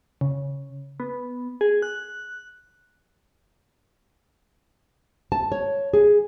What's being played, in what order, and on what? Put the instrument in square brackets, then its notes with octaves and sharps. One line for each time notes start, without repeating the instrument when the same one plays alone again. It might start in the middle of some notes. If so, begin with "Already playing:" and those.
[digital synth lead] C#3
B3
G#4
F#6
[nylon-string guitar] A5
C#5
G#4